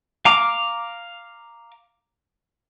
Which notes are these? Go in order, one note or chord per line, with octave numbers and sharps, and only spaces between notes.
F5 A#5 D6